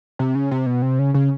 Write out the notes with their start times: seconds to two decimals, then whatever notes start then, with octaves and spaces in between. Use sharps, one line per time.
0.19 C3
0.35 C#3
0.51 C3
0.66 B2
0.82 C3
0.99 C#3
1.14 C#3